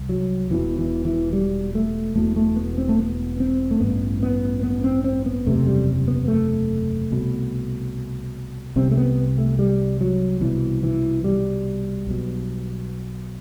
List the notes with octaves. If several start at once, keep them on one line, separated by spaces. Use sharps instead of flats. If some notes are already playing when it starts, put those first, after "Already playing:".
Already playing: C2
F#3
E1 E2 B2 E3
E3
E3
G3
A3
E1 E2 B2 A3
A3
B3
C4
A3
B3
C4
A3
A1 G2 B3
B3
B3
C4
C4
B3
F#1 E2 C3 A3
G3
B3
A3
C2 B2
C2 C3 C4
A3
B3
A3
G3
F#3
C2 B2 E3
E3
G3
B1 B2